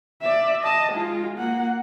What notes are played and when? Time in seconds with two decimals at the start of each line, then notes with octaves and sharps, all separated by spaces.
0.22 D5 E5
0.62 D#5 A5
0.93 G#3 F4
1.38 A#3 F#5